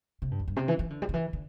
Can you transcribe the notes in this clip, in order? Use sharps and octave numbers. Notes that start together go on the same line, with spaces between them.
C3
G2
E2
G2
C3
E3
E3
D3
G3
D3
E3
D3